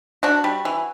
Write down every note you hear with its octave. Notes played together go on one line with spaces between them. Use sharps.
D4 F#4
G3
E3